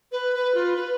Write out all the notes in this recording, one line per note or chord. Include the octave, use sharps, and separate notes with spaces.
B4
B4
F4
B4